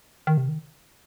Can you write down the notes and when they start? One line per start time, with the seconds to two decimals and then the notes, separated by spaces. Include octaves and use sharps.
0.27 D#3
0.37 C3
0.49 D#3